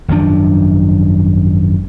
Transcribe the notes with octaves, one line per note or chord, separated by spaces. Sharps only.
G#1 F#2 F3 D4